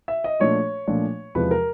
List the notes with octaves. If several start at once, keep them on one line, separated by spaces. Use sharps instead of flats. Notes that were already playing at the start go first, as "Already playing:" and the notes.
E5
D#5
A#2 F3 A3 D4 F4 C#5
A#2 F3 A3 D4 F4
E2 C3 F3 G#3 B4
A#4